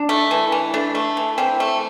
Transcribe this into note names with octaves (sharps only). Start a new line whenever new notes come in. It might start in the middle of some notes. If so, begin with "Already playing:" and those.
Already playing: D4
A3
E3
E3
A3 D4
A3
E3
E3 C4
A3